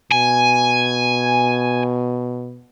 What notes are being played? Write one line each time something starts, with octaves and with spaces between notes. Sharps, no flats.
B2 G#5